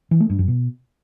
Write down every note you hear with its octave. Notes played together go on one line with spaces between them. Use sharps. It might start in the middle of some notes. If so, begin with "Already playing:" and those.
E3
A3
G2
F#2
B2